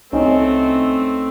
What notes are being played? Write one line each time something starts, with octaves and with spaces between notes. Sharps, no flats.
C2 A3 C4 C#4 D#4